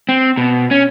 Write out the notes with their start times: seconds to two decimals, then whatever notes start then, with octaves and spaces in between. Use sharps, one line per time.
0.09 C4
0.37 B2
0.71 C#4